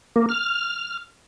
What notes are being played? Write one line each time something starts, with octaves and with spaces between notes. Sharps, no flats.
A#3
F6